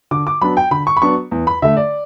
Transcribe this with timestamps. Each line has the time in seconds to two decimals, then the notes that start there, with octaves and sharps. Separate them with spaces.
0.11 D3 D6
0.27 D6
0.41 F#3 B3 D4 B5
0.57 G5
0.71 D3 B5
0.87 C#6
0.97 B5
1.02 F#3 B3 D4 C#6
1.31 E2
1.47 B5
1.62 D3 A3 E5
1.77 D5